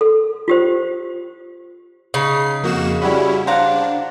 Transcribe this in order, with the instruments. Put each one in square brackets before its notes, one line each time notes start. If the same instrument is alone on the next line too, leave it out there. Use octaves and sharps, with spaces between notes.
[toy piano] A4
F4 G4 C5
[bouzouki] C#3 [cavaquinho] D#4 [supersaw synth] C7
[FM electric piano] F2 [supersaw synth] A#3 F#4 E7
[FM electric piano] G3 F#4 B5 [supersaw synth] C#4 E4
[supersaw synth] D4 [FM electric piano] C5 F#5 [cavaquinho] F5 A#5